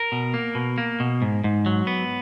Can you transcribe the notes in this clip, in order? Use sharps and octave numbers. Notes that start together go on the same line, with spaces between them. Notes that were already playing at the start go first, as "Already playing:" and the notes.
Already playing: A#4
B2
A#3
B2
A#3
B2
G#2
G#2
F#3
B3